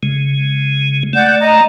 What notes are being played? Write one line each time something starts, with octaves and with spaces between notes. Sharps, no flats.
C#3 G#3
A3 D5 F#5 G6
D#5 A#5